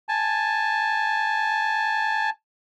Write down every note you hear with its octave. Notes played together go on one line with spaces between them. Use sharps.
G#5 A5